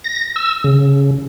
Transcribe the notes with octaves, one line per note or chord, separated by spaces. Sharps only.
A#6
E6
C#3